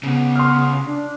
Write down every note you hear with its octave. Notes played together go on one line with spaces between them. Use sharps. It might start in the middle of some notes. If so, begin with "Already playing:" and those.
C#2 C#3 B3
C6 D#6 F6
D4